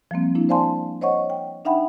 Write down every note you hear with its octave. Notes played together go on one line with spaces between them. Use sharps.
F3 G3 A#3 C4
A#3 D4 E4
C5 D5 F5 G#5 A5 C6
C5 C#5 D#5 F#5 C#6
G5
D4 D#4 E5 F#5 G5 B5